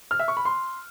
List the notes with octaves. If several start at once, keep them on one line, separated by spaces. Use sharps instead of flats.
F6
E5
C#6
B5
C6